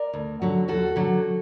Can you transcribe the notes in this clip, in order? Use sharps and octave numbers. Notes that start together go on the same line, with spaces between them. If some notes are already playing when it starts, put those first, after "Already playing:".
Already playing: A#4 D5
D2
D3 F#3
D#2 F#4 A4
D3 F#3